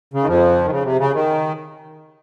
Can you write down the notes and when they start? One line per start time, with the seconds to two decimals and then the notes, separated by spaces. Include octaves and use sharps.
0.14 C#3
0.23 D#3
0.28 F2 F3
0.65 D#3
0.71 C#3
0.84 C3
0.99 C#3
1.14 D#3